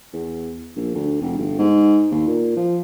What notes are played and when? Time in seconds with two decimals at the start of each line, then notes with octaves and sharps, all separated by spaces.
0.13 E2
0.76 A#1
0.95 D2
1.21 F1
1.38 G1
1.59 G#2
2.12 D#2
2.27 A#2
2.57 F3